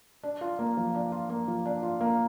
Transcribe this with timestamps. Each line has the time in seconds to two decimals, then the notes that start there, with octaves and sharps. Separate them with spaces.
0.23 D4
0.41 F4
0.59 A#3
0.77 F3
0.95 D4
1.12 F4
1.30 A#3
1.48 F3
1.66 D4
1.83 F4
2.01 A#3